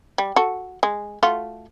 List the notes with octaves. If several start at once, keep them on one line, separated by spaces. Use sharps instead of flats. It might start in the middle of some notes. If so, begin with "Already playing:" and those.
G3
F#4 A4
G#3
A3 F4 F#4